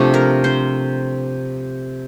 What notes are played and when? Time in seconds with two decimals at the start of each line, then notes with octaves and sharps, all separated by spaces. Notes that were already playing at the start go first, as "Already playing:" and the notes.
Already playing: C3 F3 A3 D4
0.14 A#4
0.44 C5